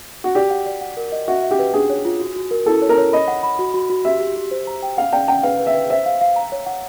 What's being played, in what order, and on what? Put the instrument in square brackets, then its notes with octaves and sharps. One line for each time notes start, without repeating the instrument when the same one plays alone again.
[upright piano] F#4
[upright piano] G4 [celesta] D5
[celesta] F#5
D5
F#5
A#4
D#5
[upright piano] F#4 [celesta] E5
[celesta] E5
[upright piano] G4
[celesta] B4
[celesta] D4 [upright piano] G#4
[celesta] C#5
F4
F#4
F#4
A#4
[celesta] E4 [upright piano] A4
[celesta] C#5
[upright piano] A#4
[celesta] C#5
[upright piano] D#5 [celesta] B5
[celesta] F#5
B5
F#4
F#4
F#4
[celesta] G4 [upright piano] E5
[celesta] G4
G4
C5
A#5
G5
[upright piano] F5 [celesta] F#5
[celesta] D5 [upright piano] G5
[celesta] F#5 [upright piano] G5
[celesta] B4 [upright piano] F5
[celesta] B4
[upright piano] E5
[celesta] B4
[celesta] C5 [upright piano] E5
[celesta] F5
F5
A#5
C#5
F#5